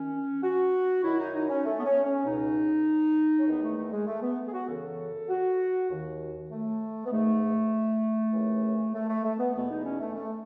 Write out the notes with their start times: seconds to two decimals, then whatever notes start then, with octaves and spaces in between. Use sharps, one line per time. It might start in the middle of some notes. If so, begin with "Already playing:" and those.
Already playing: D#3 C#4
0.43 F#4
1.04 F#2 D#3 E4
1.19 D#4
1.35 D#4
1.49 C#4
1.65 A3
1.79 B3
1.85 C#4
2.04 C#4
2.25 C#2 B2 D#4
3.40 C#4
3.46 E2 D#3 B3
3.62 A3
3.77 A3
3.92 G#3
4.07 A3
4.22 B3
4.48 G#4
4.53 F#4
4.68 F#2 C#3 E3 A4
5.29 F#4
5.90 D#2 D#3
6.51 A3
7.06 B3
7.12 G#2 D#3 A3
8.33 D#2 C#3 E3
8.94 A3
9.09 A3
9.24 A3
9.39 B3
9.55 E2 B2 B3
9.71 D#4
9.85 C#4
10.00 A3
10.16 A3